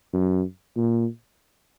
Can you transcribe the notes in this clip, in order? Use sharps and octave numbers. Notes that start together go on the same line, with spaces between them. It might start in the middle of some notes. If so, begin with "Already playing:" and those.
F#2
A#2